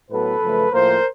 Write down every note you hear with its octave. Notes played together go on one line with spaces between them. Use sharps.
A2 F#3 B3 A4 B4
F#2 C#3 F3 A3
A2 F3 A#3 A#4 C5